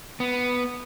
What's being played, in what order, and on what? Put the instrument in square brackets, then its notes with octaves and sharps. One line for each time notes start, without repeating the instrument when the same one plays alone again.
[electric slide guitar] B3